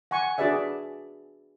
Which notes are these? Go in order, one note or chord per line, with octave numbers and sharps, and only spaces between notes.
F#5 G#5 C#6
D4 F#4 G#4 B4 D5 E5